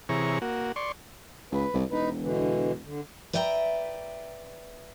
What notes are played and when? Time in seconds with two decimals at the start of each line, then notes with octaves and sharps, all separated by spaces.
0.09 C3 E3 G#4 C#5 A#5 C#6
0.42 A#3 F#4
0.76 D5 C6 C#6
1.52 C#2 B4
1.74 C2
1.91 E1 D#4 B4
2.20 B2 D3 E3
2.84 D3
3.33 B4 D5 E5 G5 G#5 A#5